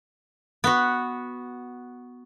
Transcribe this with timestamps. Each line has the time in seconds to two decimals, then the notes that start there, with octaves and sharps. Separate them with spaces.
0.64 B3 F#4